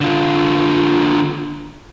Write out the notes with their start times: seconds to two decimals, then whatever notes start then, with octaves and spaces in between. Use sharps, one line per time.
0.01 D3 F4